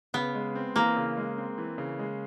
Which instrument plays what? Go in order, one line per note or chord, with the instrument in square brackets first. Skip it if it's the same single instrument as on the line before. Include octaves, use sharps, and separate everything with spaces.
[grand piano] C#3 [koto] B3
[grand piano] G#3
C4
[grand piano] E3 [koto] A#3
[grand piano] C#3
G#3
C4
E3
C#3
G#3